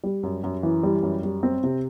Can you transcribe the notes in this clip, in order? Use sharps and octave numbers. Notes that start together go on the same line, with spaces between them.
G3
F#2
F#2
E3
G3
F#2
G3
C4
C3